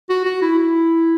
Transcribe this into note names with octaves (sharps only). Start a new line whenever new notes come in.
F#4
F#4
E4
E4